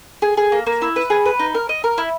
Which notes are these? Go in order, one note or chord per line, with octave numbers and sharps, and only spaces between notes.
G#4
G#4
A#3
A#3
E4
B4
G#4
B4
D#4
A#4
D#5
A#4
E4